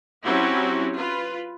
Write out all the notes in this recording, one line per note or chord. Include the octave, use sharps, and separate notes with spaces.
F#3 C4 C#4 E4 F#4 G4
F4 B4